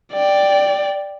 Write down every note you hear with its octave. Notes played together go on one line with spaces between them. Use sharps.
D5 G5